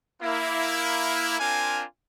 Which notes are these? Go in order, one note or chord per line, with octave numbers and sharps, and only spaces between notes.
A#3 E4
C4 D4 F4 A#4 F5 G#5